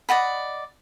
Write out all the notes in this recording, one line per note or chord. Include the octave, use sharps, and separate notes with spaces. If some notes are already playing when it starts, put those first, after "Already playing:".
D5 D#5 F#5 B5